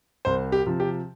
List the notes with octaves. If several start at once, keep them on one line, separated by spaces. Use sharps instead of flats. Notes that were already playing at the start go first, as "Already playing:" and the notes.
C2 C5
G4
C3 F3
G4